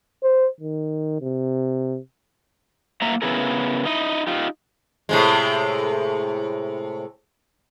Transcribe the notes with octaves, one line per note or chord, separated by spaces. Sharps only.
C5
D#3
C3
A2 F#3 A#3 E5 A#5
C#3 B3 E4 G#4 A#4
D#4 E4 D#5
D#4 F4 G4
A2 C3 G#3